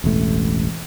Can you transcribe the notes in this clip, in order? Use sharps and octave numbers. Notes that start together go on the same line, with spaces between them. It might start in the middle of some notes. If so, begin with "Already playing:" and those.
E1 A1 A3